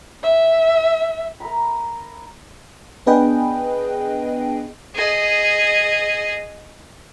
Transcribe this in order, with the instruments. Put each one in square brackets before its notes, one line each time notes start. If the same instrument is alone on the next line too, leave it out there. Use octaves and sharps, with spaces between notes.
[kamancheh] E5
[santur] A#4 E5 A#5 B5
[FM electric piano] B3 D4 G#4 B4 D#5 G5
[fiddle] G#4 D#5